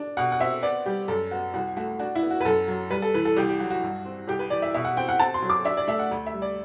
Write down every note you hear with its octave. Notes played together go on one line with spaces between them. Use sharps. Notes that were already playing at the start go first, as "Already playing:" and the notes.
Already playing: D4
B2 F#5
F#5
C4 E5
B3 D5
G3 G4
F#2 A4
B3 F#4
C2 F#4
A3 F#4
D4 F#4
E4
B3
F#4
B4
F#2 A4
F#3
G3 B4
A4
E3 B4
A4
C2 G4
G4
F#3 F#4
F#4
G2
C4
C2 G4
B4
E3 D5
E5
B2 E5
F#5
C4 G5
F#5
C4 A5
C6
F#3
D6
D4 E5
D5
A3 E5
F#5
D2
E5
G3
D5